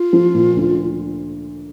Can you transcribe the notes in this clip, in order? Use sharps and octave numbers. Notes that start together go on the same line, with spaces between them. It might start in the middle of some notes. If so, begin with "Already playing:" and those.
Already playing: F4
F3
A#2
D2